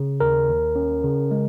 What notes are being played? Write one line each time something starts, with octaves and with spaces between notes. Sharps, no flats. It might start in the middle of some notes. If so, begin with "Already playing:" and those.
Already playing: C#3
D#2 A#4
D#2
C#4
C#3
G#3